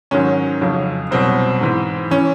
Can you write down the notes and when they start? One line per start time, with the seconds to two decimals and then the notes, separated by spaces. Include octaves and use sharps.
0.11 G#2 D#3 F#3 C#4
0.61 F2 C#3 F#3
1.11 C2 B2 F#3 C4
1.61 G#2 E3
2.11 E3 C#4